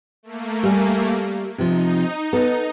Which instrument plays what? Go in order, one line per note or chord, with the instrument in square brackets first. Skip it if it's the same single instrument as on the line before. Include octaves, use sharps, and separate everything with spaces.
[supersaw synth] A3 A#3
[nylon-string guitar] G3 G#5
[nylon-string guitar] C3 F3 [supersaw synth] D#4
[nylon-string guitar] B3 A4